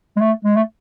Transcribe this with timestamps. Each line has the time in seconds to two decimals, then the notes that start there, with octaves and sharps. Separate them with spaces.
0.17 G#3
0.21 A3
0.45 G#3
0.56 A3